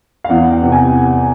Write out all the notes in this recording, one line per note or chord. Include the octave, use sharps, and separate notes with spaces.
F5
E2 F#5
G5
C3 E3
G#5